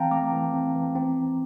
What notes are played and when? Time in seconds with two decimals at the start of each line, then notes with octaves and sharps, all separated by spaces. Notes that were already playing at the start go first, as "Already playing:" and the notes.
Already playing: E3 C4 F5 G5 A5 A#5
0.11 A3 A#5 D6
0.32 E3
0.54 C4
0.75 E3
0.95 C4